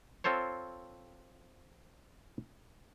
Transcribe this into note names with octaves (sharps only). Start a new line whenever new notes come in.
C4 F4 A4 C5 C#5